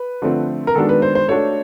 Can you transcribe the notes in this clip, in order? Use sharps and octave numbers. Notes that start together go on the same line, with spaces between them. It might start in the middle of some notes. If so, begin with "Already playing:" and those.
Already playing: B4
D3 F3 A3 C4
A#4
D#3 G#3 B3 D4 F#4 A4
B4
C5
C5
A3 D4 F#4 A4 C#5